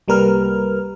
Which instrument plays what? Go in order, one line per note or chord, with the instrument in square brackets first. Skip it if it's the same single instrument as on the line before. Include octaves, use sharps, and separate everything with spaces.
[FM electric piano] C2 G3 A#3 A#4 B4 F6